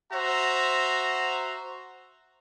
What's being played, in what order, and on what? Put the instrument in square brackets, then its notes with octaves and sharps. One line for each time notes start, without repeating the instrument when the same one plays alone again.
[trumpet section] F#4 C5 E5 A#5